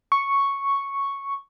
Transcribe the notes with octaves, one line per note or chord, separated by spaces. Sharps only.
C#6